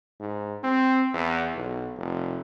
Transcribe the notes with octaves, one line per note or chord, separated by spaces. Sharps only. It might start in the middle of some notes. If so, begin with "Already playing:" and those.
G#2
C4
E2
B1
F1